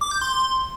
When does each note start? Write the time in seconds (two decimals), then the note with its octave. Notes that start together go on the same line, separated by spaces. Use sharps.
0.01 D6
0.11 G6
0.21 C6